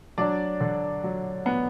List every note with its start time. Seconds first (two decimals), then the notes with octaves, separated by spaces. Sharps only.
0.18 F#3 D4 D5
0.60 D3
1.04 F#3
1.46 B3